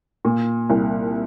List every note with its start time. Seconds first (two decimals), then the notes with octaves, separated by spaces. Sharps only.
0.25 A#2
0.70 C2